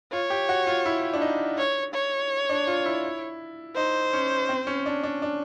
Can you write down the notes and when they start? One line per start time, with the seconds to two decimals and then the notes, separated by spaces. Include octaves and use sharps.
0.12 F4 C#5
0.30 G4
0.49 F#4
0.67 F4
0.86 E4
1.14 D4
1.21 D#4
1.58 C#5
1.94 C#5
2.49 D4
2.67 F4
2.86 E4
3.76 D#4 C5
4.13 C#4
4.49 C4
4.67 C#4
4.86 D4
5.03 D4
5.22 D4